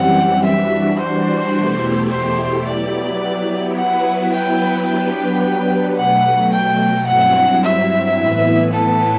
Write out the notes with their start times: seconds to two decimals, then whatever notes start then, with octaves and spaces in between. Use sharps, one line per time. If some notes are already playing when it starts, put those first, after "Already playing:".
Already playing: F#2 E3 G3 C4 G4 F#5
0.44 E3 G3 D4 F#4 E5
0.99 C5
1.55 E2 B2 A3 E4 G4
2.10 C5
2.65 F#3 B3 E4 G4 D5
3.75 F#3 B3 E4 B4 F#5
4.32 G5
4.86 F#3 B3 D4 G4 B4 G5
5.96 B2 F#3 A3 F#5
6.52 G5
7.07 G2 F#3 C4 E4 F#5
7.63 E5
8.18 A2 E3 B3 E4 B4
8.73 A4